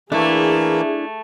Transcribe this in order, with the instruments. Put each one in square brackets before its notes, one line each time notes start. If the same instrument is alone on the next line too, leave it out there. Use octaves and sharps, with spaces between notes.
[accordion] E3 A#3 [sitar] A3 [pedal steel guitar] D4 E4 [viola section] G#4